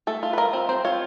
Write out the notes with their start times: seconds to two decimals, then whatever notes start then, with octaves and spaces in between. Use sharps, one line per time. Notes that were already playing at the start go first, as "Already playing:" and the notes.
0.07 A3 A4
0.23 F4
0.33 B4
0.38 F4 A#4
0.53 C4
0.69 C4 C5
0.85 F4 C#5